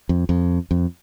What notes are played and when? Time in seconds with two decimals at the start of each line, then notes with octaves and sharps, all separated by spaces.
0.09 F2
0.29 F2
0.71 F2